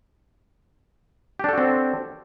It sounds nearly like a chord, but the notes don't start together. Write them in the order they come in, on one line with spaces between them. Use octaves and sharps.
G4 D4 A4 F#4 C4